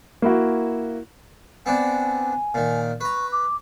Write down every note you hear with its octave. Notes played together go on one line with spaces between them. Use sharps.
A#3 E4 F#4
B3 C4 D4 G#5
A#2 D#3
B4 A#5 C#6
D6